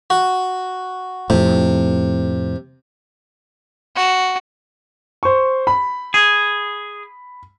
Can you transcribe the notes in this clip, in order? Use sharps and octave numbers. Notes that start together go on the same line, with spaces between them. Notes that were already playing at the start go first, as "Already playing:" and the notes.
F#4
F2 A2 C3
F#4
C5 C#6
B5
G#4